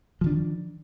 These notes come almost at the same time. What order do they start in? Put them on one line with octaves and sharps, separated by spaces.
F3 D#3 D4